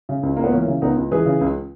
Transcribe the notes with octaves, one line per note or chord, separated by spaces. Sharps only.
C#3
C#2
C#2 A#3
B3
E3 A#3 C#4
C#3
C#2 B3 D#4
C#2
E3 G#4 B4
C#3
C#2